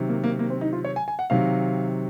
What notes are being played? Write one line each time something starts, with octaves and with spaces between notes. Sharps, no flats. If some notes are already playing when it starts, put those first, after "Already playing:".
Already playing: C3 D#3 F#3
A#3
A#3
A#3
C4
D#4
F4
C#5
G#5
G#5
F#5
C3 D#3 F#3 F5